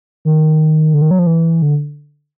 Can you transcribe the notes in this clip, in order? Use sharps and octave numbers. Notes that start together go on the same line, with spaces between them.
D#3
D3
D#3
F#3
F3
E3
D3